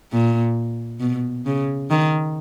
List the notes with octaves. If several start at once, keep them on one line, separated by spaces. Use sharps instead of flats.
A#2
B2
C#3
D#3